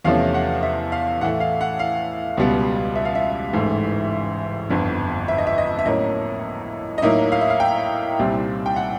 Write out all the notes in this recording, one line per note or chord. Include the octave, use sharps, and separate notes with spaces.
E2 C3 F3 A3 C#4 F5
F#5
E5
F5
A2 E3 A3 F#5
F5
F#5
F5
C#2 B2 G3 B3
E5
F5
E5
A1 G#2 E3 A3
G1 F2 D3
E5
D#5
E5
D#5
E5
A2 F#3 A#3 C#4 D#5
D#5
A2 F#3 A#3 D#4 E5
F5
E5
F5
G5
C2 A#2 G3 C4
G5
F#5